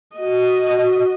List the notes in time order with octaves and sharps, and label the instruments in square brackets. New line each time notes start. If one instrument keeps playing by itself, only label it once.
[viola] F#4 D#5